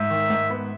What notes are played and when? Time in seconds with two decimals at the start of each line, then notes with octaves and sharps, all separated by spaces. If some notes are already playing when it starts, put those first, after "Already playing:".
Already playing: G#2 E5
0.10 D#3
0.30 G#2
0.50 B3